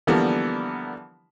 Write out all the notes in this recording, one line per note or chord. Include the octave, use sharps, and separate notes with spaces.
D3 E3 F3 G3 A#3 B3